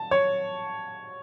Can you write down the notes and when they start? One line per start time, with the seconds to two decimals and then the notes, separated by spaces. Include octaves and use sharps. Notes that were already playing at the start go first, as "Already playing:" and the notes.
Already playing: A5
0.11 C#5